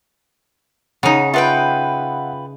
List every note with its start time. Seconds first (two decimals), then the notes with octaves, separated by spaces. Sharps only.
1.03 C#3 D#4 C#5 F#5
1.34 F4 B4 E5 F#5 G5 B5